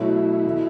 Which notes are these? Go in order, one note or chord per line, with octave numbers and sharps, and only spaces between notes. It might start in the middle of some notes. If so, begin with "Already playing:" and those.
Already playing: B2 F#3 A3 E4
B2 A3